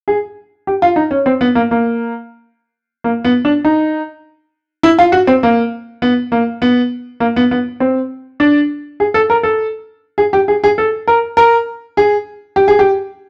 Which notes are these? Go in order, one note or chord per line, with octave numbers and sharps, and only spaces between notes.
G#4
G4
F4
D#4
C#4
C4
B3
A#3
A#3
A#3
B3
D4
D#4
E4
F4
F#4
C4
A#3
B3
A#3
B3
A#3
B3
B3
C4
D4
G#4
A4
A#4
A4
G#4
G4
G#4
G#4
A4
A#4
A#4
G#4
G4
G#4
G4